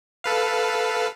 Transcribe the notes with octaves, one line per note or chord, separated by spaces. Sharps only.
A4 B4 F5